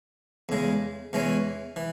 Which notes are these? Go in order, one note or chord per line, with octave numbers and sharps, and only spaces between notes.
E2 C#3 G#3
E2 E3 G#3 C#4
E3